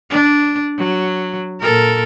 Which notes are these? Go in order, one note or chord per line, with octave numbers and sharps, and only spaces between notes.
D4
F#3
A#2 A4 A#4